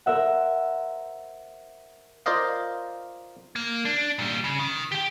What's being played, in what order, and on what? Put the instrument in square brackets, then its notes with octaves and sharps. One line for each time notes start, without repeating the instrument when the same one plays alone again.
[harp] A#4 C5 E5 F#5
[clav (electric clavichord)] F4 A#4 C5 D5 D#5 F5
[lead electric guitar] A#3
D4
A#2 G3
C#3
D#3
G4 G5